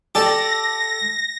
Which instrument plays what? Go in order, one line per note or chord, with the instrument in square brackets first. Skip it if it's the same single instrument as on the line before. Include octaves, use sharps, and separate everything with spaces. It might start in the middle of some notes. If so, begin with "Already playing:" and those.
[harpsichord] G4 D5 A5 [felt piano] A4 [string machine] A#6